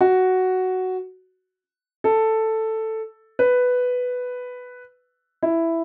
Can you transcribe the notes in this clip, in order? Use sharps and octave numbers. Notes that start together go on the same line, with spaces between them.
F#4
A4
B4
E4